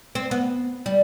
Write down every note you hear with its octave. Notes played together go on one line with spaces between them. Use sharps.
C4
B3
G3